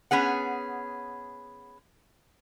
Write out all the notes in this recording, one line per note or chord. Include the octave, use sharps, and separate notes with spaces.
B3 C#4 G#4 F#5